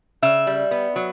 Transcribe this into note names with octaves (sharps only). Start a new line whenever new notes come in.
C#3 E5
G3
B3
F#3